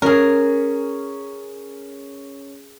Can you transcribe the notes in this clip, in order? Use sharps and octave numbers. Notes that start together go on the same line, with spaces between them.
C#4 G#4 A#4